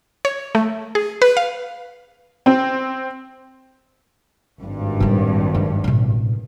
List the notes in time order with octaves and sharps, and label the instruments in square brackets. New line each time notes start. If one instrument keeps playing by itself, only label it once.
[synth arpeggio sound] C#5
A3
G#4
B4
F5
[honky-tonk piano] C4
[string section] G#1 G2
[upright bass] A2 G3
F#2
A1 B2